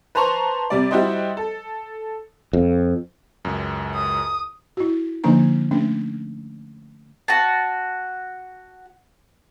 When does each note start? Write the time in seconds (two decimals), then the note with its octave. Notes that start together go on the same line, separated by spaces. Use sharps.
0.15 B4 C5 A5 A#5 C6 C#6
0.70 C3 G3 D5
0.91 G3 E4 F#4 G4 C5 D#5
1.37 A4
2.53 F2
3.45 C#2 F#2
3.95 D#6
4.77 E4 F#4
5.24 D3 F3 A#3 D4 D#4 A#5
5.71 A3 C#4 D4
7.28 F#4 F#5 A5